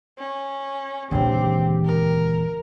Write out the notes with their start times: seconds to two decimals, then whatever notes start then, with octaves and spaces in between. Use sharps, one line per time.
0.18 C#4
1.11 D#1 C#2 D3 E3 C4 G4
1.86 A#4